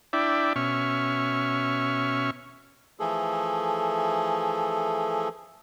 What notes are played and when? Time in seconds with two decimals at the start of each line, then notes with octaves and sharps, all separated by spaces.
0.13 D4 E4 D5 E5 G5
0.56 B2 C#4 E5 C#6 F6
3.00 E3 F3 A3 G#4 A4